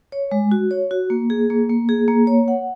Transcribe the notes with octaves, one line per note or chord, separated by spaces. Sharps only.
C#5
G#3
F#4
C#5
F#4
A#3
G#4
A#3
A#3
G#4
A#3
C#5
F#5